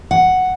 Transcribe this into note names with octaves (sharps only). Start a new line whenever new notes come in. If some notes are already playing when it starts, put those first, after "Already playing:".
F#5